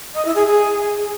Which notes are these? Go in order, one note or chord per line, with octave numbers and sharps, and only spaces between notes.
D#5
E4
G#4
G#4